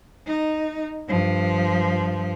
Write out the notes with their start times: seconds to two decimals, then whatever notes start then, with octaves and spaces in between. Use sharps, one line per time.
0.26 D#4
1.09 G2 F3